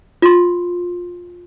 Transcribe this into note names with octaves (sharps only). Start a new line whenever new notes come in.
F4 C6